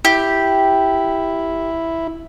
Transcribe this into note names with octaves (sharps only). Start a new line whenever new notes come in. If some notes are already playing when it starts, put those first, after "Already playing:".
E4 G4